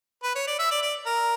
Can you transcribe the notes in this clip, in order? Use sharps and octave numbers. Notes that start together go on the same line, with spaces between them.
B4
C#5
D5
E5
D5
D5
A#4